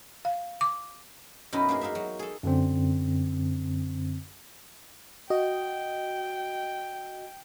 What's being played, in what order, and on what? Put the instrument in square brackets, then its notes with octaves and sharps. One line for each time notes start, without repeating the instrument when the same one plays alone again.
[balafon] F5
D6
[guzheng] F#2 B2 C#4 D#4 E4 B4
A#3 D4 D#4 G#4
G#3 A#3 D#4 G#4 E5
F#3
G#4 A4
[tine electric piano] F#2 D3 C4
[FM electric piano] F#4 D#5 [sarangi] G5